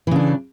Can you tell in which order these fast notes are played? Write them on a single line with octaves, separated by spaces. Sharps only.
E3 C#3 D4